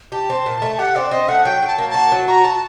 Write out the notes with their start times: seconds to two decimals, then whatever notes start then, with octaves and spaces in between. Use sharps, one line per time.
0.12 G4 A5
0.30 C4
0.46 A#2
0.62 A3
0.79 G4 F#5
0.95 C4 D5
1.11 C4 D#5
1.28 A3 F#5
1.45 F#3 G5
1.62 F#3
1.67 A5
1.78 A#3
1.90 F#4 A5
2.12 F#3
2.28 F#4 A#5
2.44 F#4 A5